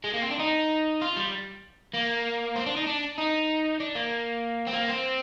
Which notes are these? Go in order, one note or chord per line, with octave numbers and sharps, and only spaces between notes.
G#3
A#3
C4
D4
D#4
F4
G3
A#3
C4
D4
D#4
D4
D#4
D4
A#3
C4
A#3
C4